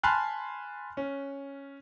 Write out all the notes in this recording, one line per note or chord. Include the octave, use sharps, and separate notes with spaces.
G#5 A5 B5 C6 F6 F#6
C#4